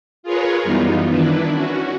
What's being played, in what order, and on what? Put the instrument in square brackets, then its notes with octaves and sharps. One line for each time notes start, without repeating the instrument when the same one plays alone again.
[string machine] F4 G#4 A#4 B4 C#5
F#2 E3 G3 B3 D#4 F4
D#3 D4 E4 B4
C#4 F#4